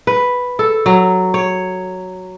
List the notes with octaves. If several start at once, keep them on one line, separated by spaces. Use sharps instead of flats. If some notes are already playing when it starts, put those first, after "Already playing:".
B4
A4
F#3
C#5